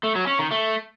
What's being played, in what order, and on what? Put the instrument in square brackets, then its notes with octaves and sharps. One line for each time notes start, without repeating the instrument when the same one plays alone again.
[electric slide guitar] A3
F#3
C#4
D#3
A3